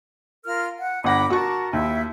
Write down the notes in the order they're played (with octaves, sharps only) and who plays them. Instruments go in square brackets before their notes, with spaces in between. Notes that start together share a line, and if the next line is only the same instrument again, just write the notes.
[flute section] F4 A#4 F6
F#5
[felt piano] G1 F#5 A#6 [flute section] B5 D6
[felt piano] F#4 C#6 [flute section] A#4 A5
[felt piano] D#2 [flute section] E4 E5